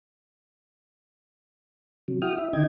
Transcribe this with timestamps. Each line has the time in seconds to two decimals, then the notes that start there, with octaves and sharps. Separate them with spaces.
2.08 C3 F#3
2.22 E4 F#4 G5 D#6 F6
2.38 E4 E5
2.53 D3 D#3 D#4 D#5 G5 G#6